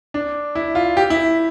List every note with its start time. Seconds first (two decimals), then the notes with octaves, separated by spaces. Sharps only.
0.14 D4
0.55 E4
0.75 F4
0.97 G4
1.10 E4